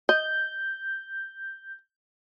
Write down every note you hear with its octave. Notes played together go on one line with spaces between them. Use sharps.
D#5 G6